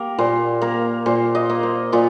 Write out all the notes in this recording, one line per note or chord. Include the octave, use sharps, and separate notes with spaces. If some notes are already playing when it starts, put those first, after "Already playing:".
Already playing: A#3 G4 A#4
A#2 C5
A#3 A#4
A#2 C5
D#5
A#3
C5
A#2 F4